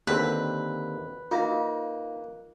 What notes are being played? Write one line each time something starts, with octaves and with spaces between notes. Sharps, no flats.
D#2 D3 C4 B4
A#3 D#4 F4 E5 F5